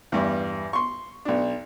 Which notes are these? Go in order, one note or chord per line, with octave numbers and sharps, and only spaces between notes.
E2 G2
C6 C#6
B1 D4